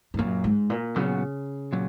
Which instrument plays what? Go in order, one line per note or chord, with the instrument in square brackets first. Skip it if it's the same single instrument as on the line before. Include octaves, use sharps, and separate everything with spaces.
[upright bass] G#2
[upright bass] F#2 [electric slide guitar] A#2 F#3 A#3
[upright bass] G#2
A#2
[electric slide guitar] A#2 F#3 B3 F#4 [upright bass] C#3
[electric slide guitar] A#2 F#3